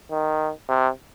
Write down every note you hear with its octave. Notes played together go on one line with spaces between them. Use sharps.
D#3
C3